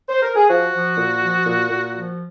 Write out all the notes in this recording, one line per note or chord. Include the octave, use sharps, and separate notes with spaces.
C5
A#4
G#4
F3 F#4
F3
A#2
F3
A#2
A#2
F3